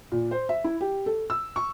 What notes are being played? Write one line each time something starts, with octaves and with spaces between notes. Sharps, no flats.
A#2
C5
E5
E4
G4
A4
E6
C#6